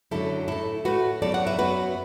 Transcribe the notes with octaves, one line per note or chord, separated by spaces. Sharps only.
F#2 D3 F#3 A3 E4 A4
A2 A3 E4 A4
A2 A3 F#4 B4
F#2 F#3 B3 A4 D5
D5 F#5
B4 E5
F#2 F#3 B3 F#4 B4